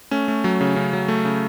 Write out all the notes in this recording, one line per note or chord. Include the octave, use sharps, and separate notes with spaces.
A3 C#4
A3
F#3
C#3
C#3
F#3
A3
C#3